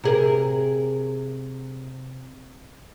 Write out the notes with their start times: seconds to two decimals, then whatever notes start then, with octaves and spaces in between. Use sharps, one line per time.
0.04 C3 G#4 A#4